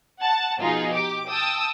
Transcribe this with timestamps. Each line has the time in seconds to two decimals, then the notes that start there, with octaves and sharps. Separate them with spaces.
0.21 F#5 A5
0.59 B2 F3 D#4 F4 G#4
0.94 G4 D6
1.29 G5 A5 D#6 E6